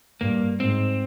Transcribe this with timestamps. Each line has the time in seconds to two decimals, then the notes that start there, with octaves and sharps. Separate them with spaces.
0.21 G2 A#3
0.60 G#2 C4